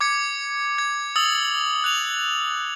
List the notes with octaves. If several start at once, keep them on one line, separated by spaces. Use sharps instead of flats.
D6 G#6 C#7
G#6
D#6 E6 A6 F7 F#7
F#6 F7